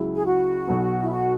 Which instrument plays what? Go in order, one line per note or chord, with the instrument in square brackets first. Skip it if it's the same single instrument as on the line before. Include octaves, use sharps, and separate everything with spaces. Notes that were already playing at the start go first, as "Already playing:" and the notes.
Already playing: [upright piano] C#2 C#3 F#3 E4
[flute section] G#4
F#4
[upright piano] B1 B2 F#3 B3
[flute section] E4
F#4